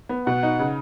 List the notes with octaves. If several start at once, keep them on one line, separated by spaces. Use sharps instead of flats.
B3
B2 F#5
D#4
C#3